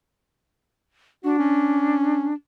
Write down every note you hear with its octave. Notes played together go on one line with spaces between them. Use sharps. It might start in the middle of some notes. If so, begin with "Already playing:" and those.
D4 F#4
C#4